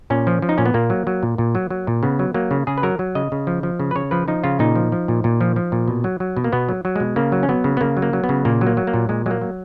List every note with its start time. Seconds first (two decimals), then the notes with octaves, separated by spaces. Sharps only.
0.10 A#2 C#4
0.27 F3
0.42 F3
0.49 D#4
0.58 A#2 C#4
0.65 B3
0.74 A#2 A#3
0.90 F#3
1.07 F#3
1.23 A#2
1.38 A#2
1.55 F#3
1.70 F#3
1.87 A#2
2.03 C#3 B3
2.19 F#3
2.34 F#3 A#3
2.51 C#3
2.67 C#3 G#4
2.78 B4
2.83 F#3 A#4
2.99 F#3
3.15 C#3 D#5
3.32 C#3
3.47 F3
3.63 F3
3.80 C#3
3.91 B4
3.95 C#3 C#5
4.11 F3 B4
4.28 F3 D#4
4.44 C#3 F4
4.59 A#2 D#4
4.75 F3
4.92 F3
5.08 A#2
5.24 A#2
5.41 F3
5.56 F3
5.72 A#2
5.88 B2
6.04 F#3
6.20 F#3
6.36 B2
6.44 A#3
6.52 B2 B3
6.69 F#3
6.85 F#3
6.96 B2 G#3
7.16 C#3 A#3
7.32 F#3
7.43 C#4
7.49 F#3 B3
7.64 C#3
7.77 B3
7.81 C#3 A#3
7.97 F#3
8.02 A#3
8.13 F#3
8.24 B3
8.29 C#3
8.45 A#2 A#3
8.61 F#3
8.67 A#3
8.77 F#3
8.87 A#3
8.94 A#2
9.09 A#2 G#3
9.26 F#3 G#3
9.31 A#3
9.41 F#3